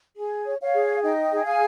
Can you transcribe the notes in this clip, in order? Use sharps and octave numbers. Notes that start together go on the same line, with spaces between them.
G#4
C#5
C#5 F5
G#4
D#4 D#5 G5
G#4 G5
F5 G#5